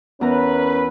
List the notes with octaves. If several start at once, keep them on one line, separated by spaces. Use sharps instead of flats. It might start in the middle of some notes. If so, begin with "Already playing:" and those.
E2 C#4 A#4 B4 A#5